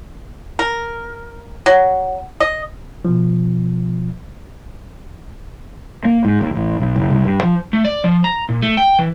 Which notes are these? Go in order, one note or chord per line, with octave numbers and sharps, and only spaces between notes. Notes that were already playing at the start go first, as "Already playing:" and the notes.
A#4
F#3
D#5
B2 F3
A#3
G#2
D#2
A1
B1
F#1
C2
G2
F3
A3
D5
F3
A#5
A#2
A3
G5
E3